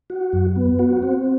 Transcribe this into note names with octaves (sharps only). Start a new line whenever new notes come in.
F#4
F#2
B3
F#4
C4